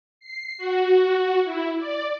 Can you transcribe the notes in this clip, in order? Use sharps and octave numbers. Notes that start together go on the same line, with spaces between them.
C7
F#4
E4
D5